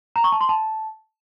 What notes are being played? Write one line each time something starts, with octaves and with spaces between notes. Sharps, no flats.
A#5
C#6
A5
C6
A5